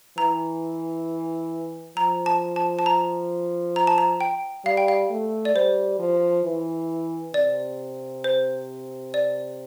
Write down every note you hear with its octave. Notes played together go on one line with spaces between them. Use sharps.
E3 A#5
F3 A#5
A5
A5
A5
A#5
A#5
A5
A#5
G5
G3 F5
G5
F5
A3
D5
G3 C5
F3
E3
C3 D5
C5
D5